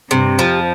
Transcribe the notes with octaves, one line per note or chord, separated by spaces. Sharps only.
G2 C3
F2 F3